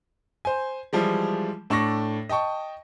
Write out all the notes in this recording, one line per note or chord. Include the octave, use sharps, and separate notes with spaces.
C5 G#5
E3 F3 G3 G#3
A2 D4 A4 C#6 A#6
D#5 G5 A5 C#6